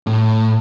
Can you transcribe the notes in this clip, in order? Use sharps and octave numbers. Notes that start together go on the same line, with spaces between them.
A2